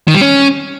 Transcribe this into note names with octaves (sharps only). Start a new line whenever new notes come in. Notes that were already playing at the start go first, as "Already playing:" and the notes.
D#3
G3
C#4